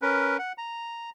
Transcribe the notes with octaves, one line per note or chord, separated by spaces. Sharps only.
C#4 A#4 B4
F#5
A#5